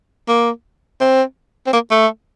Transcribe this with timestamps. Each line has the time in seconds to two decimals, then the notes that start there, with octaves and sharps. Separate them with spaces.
0.28 A#3
1.01 C4
1.67 C4
1.73 A#3
1.91 A3